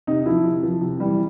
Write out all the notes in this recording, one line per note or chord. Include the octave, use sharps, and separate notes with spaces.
C3 D#4
F3 E4
C3
F3
C3
E3 G3